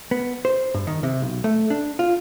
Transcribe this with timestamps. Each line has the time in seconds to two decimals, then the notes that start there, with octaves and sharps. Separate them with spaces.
0.11 B3
0.45 C5
0.74 G2
0.87 D#3
1.03 C3
1.22 B1
1.44 A3
1.70 D4
1.99 F4